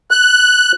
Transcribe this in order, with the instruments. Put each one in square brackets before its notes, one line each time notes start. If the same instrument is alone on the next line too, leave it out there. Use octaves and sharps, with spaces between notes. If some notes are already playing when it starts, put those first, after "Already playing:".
[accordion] F#6